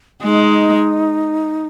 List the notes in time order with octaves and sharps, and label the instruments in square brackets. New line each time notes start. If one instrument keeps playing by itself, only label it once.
[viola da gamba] G#3 [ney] D#4